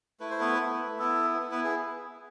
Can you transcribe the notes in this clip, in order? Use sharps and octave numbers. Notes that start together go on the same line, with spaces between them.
A3 E4 B4
C5
B3 B4
A3 E4
B3 E4 A4
B3
E4
B3 B4
G#4